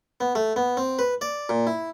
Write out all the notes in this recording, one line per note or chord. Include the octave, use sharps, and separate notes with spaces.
B3
A3
B3
C4
B4
D5
A#2
E4